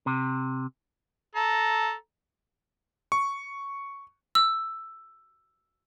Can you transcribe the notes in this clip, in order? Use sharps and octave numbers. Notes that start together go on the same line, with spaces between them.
C3
A4 A#5
C#6
E6